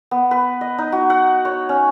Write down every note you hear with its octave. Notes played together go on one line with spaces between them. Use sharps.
B3
B4
D#5
D#4
F#4
F#5
C#5
C#4